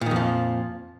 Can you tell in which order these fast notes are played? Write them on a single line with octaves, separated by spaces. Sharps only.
A#2 D#3 F2 F3